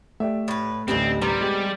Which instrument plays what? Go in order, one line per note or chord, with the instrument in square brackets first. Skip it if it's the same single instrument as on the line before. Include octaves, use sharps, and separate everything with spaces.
[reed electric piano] A3 [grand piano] G4 D5 E5
[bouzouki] A2 B4
[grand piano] A1 D2 [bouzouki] G3 B3 D#5 [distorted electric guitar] C4
[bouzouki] C3 B3 A#5 [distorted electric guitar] G3
[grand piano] G#3 G4